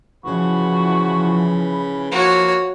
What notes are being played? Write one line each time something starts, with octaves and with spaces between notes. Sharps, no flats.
C#3 E3 F3 F#4 B4 B5
F3 A#3 E4 F#4 C#5